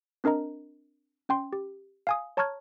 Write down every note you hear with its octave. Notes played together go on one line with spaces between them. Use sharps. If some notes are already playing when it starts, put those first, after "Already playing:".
C4 D4 A#4 D#5 A#5
C#4 G5 C6
G4
F5 G#5 D#6
C#5 A5 A#5 C#6 F6 G#6